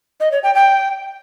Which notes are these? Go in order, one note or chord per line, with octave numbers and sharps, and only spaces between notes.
D#5
C#5
G5
G5